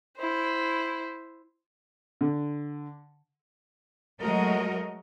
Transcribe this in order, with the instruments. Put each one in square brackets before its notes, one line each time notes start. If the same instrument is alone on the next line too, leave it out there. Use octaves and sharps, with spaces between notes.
[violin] E4 C5
[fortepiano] D3
[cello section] F#3 G#3 A3 F#4 A#4 D#5